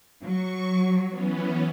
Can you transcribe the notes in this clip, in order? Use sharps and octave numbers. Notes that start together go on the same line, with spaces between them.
F#3 C#6
E3 B3 C#4